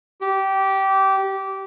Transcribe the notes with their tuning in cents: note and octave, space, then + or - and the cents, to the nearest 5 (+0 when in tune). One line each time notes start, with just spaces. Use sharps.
G4 -20